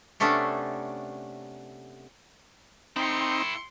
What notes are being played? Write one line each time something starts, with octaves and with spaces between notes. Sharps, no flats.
C3 A3 B3 C#4 D4 A4
C4 D#4 E4 G5 C6 C#7